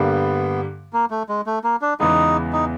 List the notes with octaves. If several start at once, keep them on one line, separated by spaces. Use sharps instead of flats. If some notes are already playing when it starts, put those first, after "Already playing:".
Already playing: G2 D3 G3 A#3 B3
A#3
A3
G#3
A3
A#3
D4
E2 C#3 E3 G#3 B3 D#4
D#4